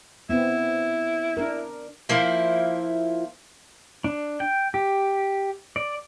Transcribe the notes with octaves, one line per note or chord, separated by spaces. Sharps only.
B3 C4 E4
D4 A#4
F3 A#3 E4 C5
D4
G5
G4
D5